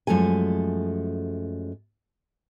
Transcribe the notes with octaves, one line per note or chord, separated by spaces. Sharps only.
F#2 F3 G#3 A3 G#5